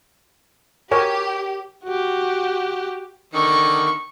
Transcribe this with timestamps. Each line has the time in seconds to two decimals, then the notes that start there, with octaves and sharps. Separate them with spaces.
0.91 G4 A#4 C#5 G#5
1.84 F#4 G4
3.34 D3 D#3 C#6